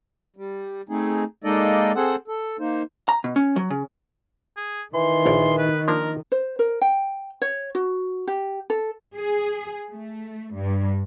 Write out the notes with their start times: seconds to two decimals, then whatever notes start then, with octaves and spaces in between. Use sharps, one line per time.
0.36 G3
0.89 A3 C4 D#4 G#4
1.44 G#3 A#3 D#4 A4 D5 D#5
1.96 C4 G#4 A4 C5 F#5
2.28 A4
2.59 A#3 D#4 C5
3.09 A#5
3.24 B2
3.36 C#4
3.56 F#3
3.70 C#3
4.57 G#4
4.94 D#3 E3 C6
5.26 A#1 C#5 D5
5.58 B4
5.88 F3 A#3 D4 A#4
6.32 C5
6.59 A#4
6.82 G5
7.42 C#5
7.75 F#4
8.27 G4
8.70 A4
9.16 G#4
9.91 A3
10.55 G2